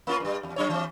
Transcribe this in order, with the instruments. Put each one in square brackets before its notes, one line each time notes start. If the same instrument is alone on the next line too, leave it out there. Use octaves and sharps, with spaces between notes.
[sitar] A#3 C#4 F4
G2 G3
E2
F#3 D4 C#5
E3 C4